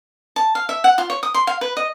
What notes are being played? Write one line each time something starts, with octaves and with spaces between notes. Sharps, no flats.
A5
F5
E5
F#5
F4
C#5
D#6
C6
F5
B4
D#5